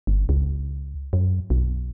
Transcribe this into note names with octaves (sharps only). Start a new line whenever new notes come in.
G1
C#2
F#2
B1